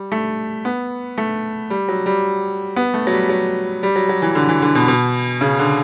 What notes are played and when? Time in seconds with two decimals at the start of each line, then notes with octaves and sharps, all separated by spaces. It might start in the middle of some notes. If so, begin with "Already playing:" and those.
Already playing: G3
0.12 A3
0.65 B3
1.18 A3
1.70 G3
1.88 F#3
2.06 G3
2.76 B3
2.94 A3
3.07 F#3
3.12 G3
3.29 F#3
3.83 G3
3.96 F#3
4.09 F#3
4.22 E3
4.35 D3
4.49 E3
4.62 D3
4.75 B2
4.88 B2
5.41 C#3
5.59 D3